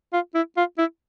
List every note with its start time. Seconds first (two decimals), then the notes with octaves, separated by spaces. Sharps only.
0.13 F4
0.34 E4
0.57 F4
0.78 E4